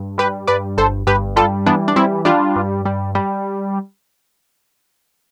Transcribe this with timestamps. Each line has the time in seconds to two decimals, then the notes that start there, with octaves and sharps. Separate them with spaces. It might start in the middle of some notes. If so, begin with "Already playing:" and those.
Already playing: G2
0.18 G3 G4 B4
0.47 G2 B4 D5
0.78 G1 A4 C5
1.07 G2 G4 B4
1.36 G3 F4 A4
1.66 E3 B3 D4
1.88 D4
1.96 G3 C4 E4
2.25 G3 D4 F4
2.56 G2
2.85 G3
3.15 G3